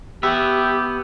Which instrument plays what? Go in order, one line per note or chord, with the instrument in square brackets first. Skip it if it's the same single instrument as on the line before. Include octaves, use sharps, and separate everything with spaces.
[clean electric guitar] B3 E5 [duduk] G4